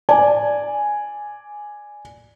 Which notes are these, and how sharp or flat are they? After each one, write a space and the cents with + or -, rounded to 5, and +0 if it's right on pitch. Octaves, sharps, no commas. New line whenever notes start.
D5 +0 G#5 +0